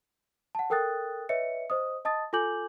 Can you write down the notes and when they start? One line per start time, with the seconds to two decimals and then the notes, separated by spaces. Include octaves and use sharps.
0.55 F#5 A5
0.70 A4 A#4 G5 D#6 F#6 A6
1.29 B4 C#5 D#5 E5 C#7
1.70 C5 D#5 D#6
2.05 D#5 A5 D#6 A6
2.33 F4 A4 G#5 D6 G6 F#7